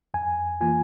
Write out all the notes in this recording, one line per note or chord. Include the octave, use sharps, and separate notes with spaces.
F2 G#5
E3 A#3 F4 G#5